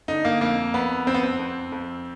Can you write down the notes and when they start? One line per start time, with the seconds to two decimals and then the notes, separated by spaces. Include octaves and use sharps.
0.08 D3 D#4
0.25 A#3
0.41 F2 A#3
0.74 F2 B3
1.07 F2 C4
1.14 B3
1.23 C4
1.39 F2
1.72 F2